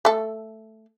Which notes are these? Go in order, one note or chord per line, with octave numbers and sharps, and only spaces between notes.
A3 A4